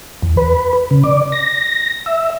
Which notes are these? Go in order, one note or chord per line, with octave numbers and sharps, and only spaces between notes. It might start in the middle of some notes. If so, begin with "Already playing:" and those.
E2
B4
C#3
D5
A#6
E5